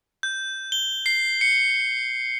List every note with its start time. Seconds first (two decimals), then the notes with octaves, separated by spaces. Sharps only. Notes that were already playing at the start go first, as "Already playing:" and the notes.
0.23 G6
0.72 G7
1.06 C7
1.41 C#7